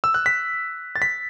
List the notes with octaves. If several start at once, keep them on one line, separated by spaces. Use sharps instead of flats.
E6
F#6
B6
A6
B6